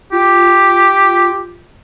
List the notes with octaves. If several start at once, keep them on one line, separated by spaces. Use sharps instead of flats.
F4 G4